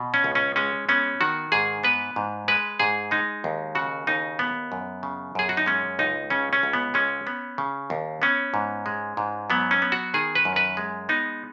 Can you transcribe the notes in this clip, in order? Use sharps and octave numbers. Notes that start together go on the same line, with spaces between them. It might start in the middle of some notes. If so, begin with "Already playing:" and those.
Already playing: B2
C#4
C#2
C#4
G#3 C#4
B3 C#4
D#3 F#4
G#2 G#4
B3 B4
G#2
G#3 B4
G#2 G#4
G#3 D#4
D#2
C#3 F#4
D#2 D#4
B3
F#2
C#3
F#2 G#4
F#4
D#4
G#3 C#4
C#2 D#4
C#3 C#4
C#4
C#2
B3
G#3 C#4
B3
C#3
D#2
B3 C#4
G#2
G#3
G#2
F#3 B3
C#4
B3
F#4
D#3 G#4
B4
F#2
B4
G#3
B3 D#4